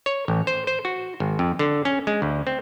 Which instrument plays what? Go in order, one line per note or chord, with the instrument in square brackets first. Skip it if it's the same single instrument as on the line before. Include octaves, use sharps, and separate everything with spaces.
[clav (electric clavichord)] C#5
A1
C5
C5
F#4
G#1
F2
D3
C#4
G#3
D2
C4